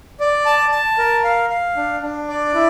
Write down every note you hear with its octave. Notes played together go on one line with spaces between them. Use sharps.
D5
A5
A5
A#4
F5
F5
D4
D4
D5
E4